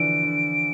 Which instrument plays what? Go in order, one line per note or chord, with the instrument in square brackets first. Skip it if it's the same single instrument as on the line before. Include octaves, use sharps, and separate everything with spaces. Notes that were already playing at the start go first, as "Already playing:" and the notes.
Already playing: [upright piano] D3 E3 F3 [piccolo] D7
[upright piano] D3